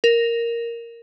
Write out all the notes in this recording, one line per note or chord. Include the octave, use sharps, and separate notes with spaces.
A#4